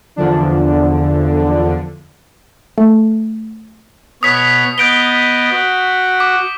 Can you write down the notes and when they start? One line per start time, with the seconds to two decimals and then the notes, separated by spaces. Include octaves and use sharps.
0.16 E2 D3 F3 D4
2.78 A3
4.23 B2 C#5 D#6 B6
4.78 B3 D#5 G6 D7 G7
5.51 F#4
6.20 D6